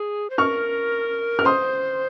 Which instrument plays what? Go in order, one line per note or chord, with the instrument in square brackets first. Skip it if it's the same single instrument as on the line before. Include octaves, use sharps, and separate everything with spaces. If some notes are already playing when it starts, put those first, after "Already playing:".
Already playing: [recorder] G#4
C5
[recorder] A#4 [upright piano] C#6 F6
[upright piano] F6
[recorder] C5 [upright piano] C6 D#6